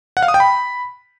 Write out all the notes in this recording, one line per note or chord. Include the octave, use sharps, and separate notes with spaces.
F#5
F5
D#6
G5
B5